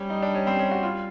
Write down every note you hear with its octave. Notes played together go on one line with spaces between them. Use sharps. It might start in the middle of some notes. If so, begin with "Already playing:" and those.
Already playing: G3 C#4
D#4
D4
C#4
C4
C#4
F#4
F4